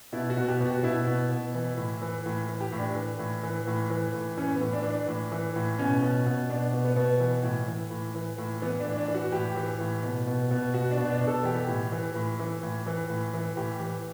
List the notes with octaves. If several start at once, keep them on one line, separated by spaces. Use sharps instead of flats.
B2 E4
F#4
B2
G4
B2
F#4
B2 E4
B2
B2
E3
A2
E3
A2
E3
G4
A2
D4
E3
A2
E3
A2
E3
A2
E3 C#4
B3
A2
D4
E3
D4
A2
E3
A2
B2 C#4
B2
B2
B2 D4
B2
B3
B2
E3
A2
E3
A2
E3
A2
E3 B3
D4
A2
D4
E3
F#4
A2 G4
E3
A2
B2
B2
B2
B2 F#4
D4
B2
D4
B2
A4
E3 G4
A2
E3
A2
E3
A2
E3
A2
E3
A2 G4
E3